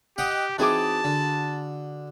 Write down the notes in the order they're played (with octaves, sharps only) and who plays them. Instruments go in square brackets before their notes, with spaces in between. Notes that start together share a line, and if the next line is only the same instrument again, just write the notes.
[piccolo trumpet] G4 [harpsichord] D#5 F#5 G5
[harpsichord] E3 C4 D#4 [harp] F#4 G#4 D6 [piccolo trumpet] A5
[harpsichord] D3